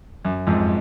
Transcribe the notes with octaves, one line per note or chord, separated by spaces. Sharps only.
F#2
F2 G#2